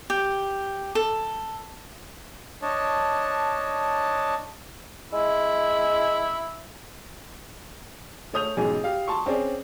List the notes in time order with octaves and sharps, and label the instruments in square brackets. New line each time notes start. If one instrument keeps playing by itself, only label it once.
[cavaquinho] G4
A4
[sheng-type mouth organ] D4 C#5 D#5 A5
[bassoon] G#3 [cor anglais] E4
[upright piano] A3 C#5 D#6 G6 F7
A1 G#2 B2 G#4 G#5
G4 F5
A5 C6 C#6
C4 C#4 G#4 D5